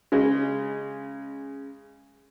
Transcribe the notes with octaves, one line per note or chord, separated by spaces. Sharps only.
C#3 G#3